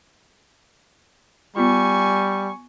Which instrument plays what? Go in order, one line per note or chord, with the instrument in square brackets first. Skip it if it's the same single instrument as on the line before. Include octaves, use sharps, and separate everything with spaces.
[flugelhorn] G3 [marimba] B3 F4 [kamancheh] G#5 C#6